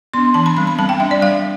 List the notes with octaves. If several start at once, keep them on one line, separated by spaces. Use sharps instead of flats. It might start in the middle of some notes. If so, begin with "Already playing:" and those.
B3 D4 C6
E3 A5
B5
G3 C4 B5
B5
G3 A5
G5
D4 E5
D5
G3 F5